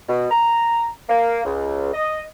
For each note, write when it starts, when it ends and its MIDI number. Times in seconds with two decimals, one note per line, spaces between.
0.09 0.27 47
0.31 0.86 82
1.09 1.41 58
1.45 1.90 37
1.94 2.22 75